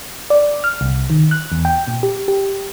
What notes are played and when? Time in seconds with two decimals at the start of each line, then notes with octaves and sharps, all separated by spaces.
0.30 D5
0.64 F6
0.81 C2
1.10 D#3
1.31 F#6
1.52 E2
1.65 G5
1.88 A#2
2.03 G4
2.28 G4